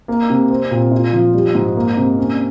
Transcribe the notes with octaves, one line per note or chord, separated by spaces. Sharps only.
A#3
C3
C4
A#2
F4
F3
G3
G#2
A#3
C3
C#4